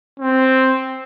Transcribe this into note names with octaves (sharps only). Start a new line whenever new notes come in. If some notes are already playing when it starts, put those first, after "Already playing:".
C4